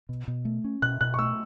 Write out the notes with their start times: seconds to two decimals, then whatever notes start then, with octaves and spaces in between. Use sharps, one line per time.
0.09 B2
0.28 B2
0.45 A3
0.64 C#4
0.82 B2 F#6
1.01 B2 F#6
1.14 C#6
1.18 A3 E6